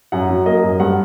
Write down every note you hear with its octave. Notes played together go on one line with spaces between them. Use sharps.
F#2 F#5
F#3
A#3 D#5
F#2
G2 F#5